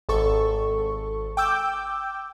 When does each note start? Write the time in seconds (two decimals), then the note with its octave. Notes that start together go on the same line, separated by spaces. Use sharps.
0.09 G#1 A4 C#6
1.37 G5 D6 E6 G6